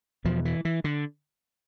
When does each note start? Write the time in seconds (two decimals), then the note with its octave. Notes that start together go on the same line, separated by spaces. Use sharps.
0.25 E2 B2 F3
0.45 E3
0.65 E3
0.84 D3